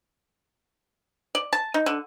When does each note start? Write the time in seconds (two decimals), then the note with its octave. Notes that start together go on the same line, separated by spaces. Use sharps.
1.35 D5
1.53 A5
1.74 D#4
1.86 D3